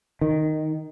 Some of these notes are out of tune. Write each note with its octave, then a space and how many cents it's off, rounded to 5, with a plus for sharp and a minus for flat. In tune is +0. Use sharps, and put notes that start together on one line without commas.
D#3 -5